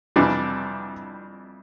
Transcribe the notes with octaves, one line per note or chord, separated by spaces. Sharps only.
F2 C3 E3 G3 D4